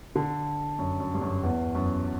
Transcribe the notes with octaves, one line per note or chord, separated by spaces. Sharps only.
D3
F#2
F#2
G2
F#2
E2
F#2